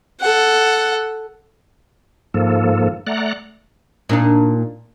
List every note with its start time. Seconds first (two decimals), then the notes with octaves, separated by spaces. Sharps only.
0.21 A4 F#5
2.34 G#2 F3 A#3 A4
3.07 A3 D5 F#5 A#5 F#6
4.09 A#2 D4 D#4